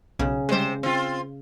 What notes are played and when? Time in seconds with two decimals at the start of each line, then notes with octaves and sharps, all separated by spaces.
0.19 B1 C#3
0.49 C3 G3 G#3 C5
0.83 C4 F4 F5